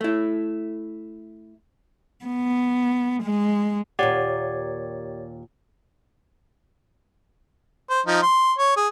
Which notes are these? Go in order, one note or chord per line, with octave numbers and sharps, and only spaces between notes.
A3 E4
B3
G#3
D#2 A#2 G4 C#5 D5 F#5
C5
F3 D#4
C6
C#5
G#4